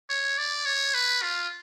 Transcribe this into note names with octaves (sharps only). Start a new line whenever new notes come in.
C#5
D5
C#5
B4
F4